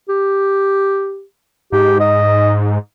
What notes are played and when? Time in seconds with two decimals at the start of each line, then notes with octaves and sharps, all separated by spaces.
0.09 G4
1.72 G#2 G4
2.00 D#5